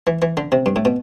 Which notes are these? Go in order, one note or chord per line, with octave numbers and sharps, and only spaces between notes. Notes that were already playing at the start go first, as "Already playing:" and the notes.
E3
E3
D3
C3
G2
A2
B2